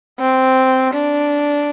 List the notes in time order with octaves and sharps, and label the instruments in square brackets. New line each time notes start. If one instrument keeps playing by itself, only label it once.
[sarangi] C4
D4